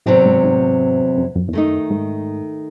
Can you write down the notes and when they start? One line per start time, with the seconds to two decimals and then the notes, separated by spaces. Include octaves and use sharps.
0.06 E2 A2 C3 F#3 C4
0.25 G#2
0.43 G#2
0.54 A2
0.65 G#2
1.17 F#2
1.35 F#2
1.48 E2
1.53 F#2 D#3 A3 D#4
1.90 G#2